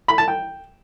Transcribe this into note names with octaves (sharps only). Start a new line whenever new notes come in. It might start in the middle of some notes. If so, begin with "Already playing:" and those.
B5
A5
G5